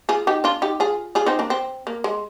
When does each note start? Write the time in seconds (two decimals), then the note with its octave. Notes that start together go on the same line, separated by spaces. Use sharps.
0.09 F4 G#4
0.27 D#4 G4
0.44 D4 F4
0.62 D#4 G4
0.80 F4 G#4
1.15 F4 G#4
1.26 C4 D#4
1.39 A#3 D4
1.50 C4
1.87 A#3
2.04 G#3